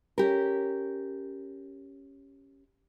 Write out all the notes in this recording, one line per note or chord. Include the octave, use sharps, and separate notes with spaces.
C#4 G4 A#4